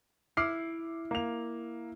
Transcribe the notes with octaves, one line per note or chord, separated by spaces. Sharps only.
E4 D6 F6 C7
A#3 F7